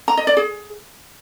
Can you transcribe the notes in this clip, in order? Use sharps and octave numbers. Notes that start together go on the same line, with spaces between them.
A#5
D#5
D5
G#4